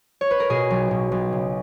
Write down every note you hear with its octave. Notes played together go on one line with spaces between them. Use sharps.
C#5
B4
A#4
B2 G#4
B1
B2
B1
C#3